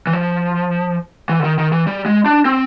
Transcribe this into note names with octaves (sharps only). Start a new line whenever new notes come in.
E3
F3
E3
D3
D#3
D#3
E3
G3
G#3
D4
C4